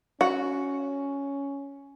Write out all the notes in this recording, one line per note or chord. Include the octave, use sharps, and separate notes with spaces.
C#4 F#4